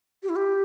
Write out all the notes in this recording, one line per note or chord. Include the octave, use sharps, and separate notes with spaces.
G4
E4
G4